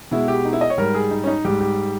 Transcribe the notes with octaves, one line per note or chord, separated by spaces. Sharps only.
B2 G#3 E4
G4
D#4
E4
D#5
C#5
G#2 G3 A#4
G#4
D#4
C#4
D#4
G#2 G3 G4
G4